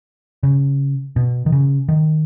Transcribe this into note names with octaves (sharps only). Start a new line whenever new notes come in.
C#3
B2
D#3
C#3
D#3